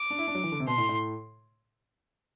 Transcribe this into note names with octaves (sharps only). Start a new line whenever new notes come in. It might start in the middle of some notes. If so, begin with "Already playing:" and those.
Already playing: D6
D4
E4
D4
F#3
E3
D3
C3
B2 C6
A2
A2